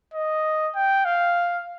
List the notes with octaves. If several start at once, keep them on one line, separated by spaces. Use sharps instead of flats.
D#5
G5
F5